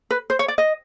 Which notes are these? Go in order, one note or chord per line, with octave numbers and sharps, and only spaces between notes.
B4
C5
C#5
D5
D#5